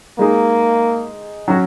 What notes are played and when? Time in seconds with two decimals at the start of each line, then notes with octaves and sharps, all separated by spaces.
0.19 G#3 A#3 D#4 G#4
1.48 F#3 C#4 F#4